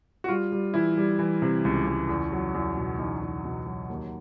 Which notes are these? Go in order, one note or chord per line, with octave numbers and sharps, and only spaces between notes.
F#4
G3 F4
G3
E3 E4
G3
E3
C3
C#2
C#2
E2
F#3
E2
B2
E2 D#4
E2
B2
F#3
D#2